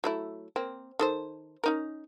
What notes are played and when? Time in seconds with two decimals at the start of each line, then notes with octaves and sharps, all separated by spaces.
0.04 F#3 A3 E4
0.56 A#3 C4
0.99 D#3 A4 C5
1.64 C#4 D#4 A#4